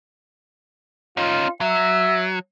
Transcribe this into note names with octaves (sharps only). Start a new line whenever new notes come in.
C#4 D#4 F4
F#3 E5